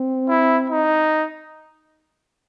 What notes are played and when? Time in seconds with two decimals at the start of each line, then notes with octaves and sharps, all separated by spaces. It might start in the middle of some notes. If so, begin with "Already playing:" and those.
Already playing: C4
0.29 E4
0.70 D#4